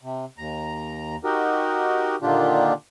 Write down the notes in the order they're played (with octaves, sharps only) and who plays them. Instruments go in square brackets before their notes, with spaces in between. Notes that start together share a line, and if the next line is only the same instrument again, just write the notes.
[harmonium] C3
D#2 A#5
D#4 F#4 G4 A#4
A#2 D3 D#3 D4 F4 G4